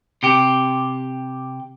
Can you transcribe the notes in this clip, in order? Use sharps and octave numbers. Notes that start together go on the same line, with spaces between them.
C3 G4